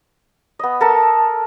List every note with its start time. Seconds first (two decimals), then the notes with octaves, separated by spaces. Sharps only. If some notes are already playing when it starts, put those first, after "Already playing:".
0.59 B3 D#5
0.81 A4 A#4 A5